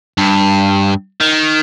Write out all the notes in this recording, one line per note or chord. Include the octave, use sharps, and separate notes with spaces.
G2
D#3